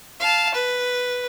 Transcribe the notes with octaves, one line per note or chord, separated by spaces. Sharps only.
F5 A5
B4